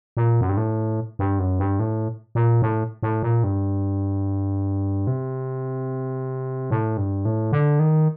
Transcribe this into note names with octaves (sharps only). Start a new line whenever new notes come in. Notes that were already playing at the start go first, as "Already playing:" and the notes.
A#2
F#2
G2
A2
G2
F#2
G2
A2
A#2
A2
A2
A#2
G2
C3
A2
G2
A2
D3
D#3